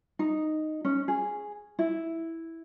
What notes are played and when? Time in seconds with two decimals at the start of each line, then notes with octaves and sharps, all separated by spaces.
0.19 D#4
0.85 C#4
1.08 G#4
1.79 E4